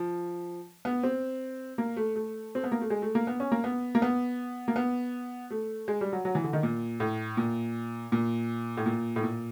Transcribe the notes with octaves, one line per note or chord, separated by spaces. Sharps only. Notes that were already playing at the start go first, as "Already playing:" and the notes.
Already playing: F3
B3
C4
A#3
A3
A3
C4
B3
A#3
A3
G#3
A3
A#3
B3
C#4
A#3
B3
A#3
B3
A#3
B3
A3
G#3
G3
F#3
F#3
E3
D3
D#3
A#2
A2
A#2
A#2
A2
A#2
A2
A#2